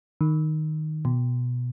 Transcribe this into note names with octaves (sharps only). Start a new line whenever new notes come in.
D#3
B2